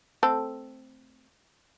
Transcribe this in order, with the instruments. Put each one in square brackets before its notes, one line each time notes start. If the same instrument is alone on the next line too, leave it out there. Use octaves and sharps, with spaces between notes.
[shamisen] A3 C4 A4